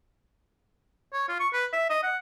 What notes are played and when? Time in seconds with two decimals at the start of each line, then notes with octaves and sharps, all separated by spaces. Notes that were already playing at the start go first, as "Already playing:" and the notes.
1.13 C#5
1.28 F4
1.40 C#6
1.53 B4
1.73 E5
1.90 D#5
2.03 F#5